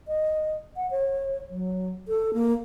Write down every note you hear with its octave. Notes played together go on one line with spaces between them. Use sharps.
D#5
F#5
C#5
F#3
A4
A#3